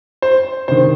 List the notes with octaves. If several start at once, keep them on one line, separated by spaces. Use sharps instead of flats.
C5
C3 D#3 C5